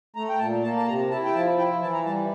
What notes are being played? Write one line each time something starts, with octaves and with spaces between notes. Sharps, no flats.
A3 A#5
G5
A#2 A5
A#3 A5
A5
C3 A#5
E4 A5
G5
F3 A5
E4 G5
E3 A5
A#5
G3 A5